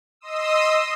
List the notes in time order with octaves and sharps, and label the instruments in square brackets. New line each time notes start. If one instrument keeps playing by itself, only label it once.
[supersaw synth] D#5 C6 D#6 E6